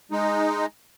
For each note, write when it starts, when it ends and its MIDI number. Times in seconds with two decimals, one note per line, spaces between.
0.11 0.66 56
0.11 0.66 63